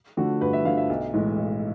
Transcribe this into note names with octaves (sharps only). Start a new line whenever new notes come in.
D3 F3 A3 F#4
G2 B4
E5
D3 F3 A3 F5
E5
B1
A2 E3 G#3
B1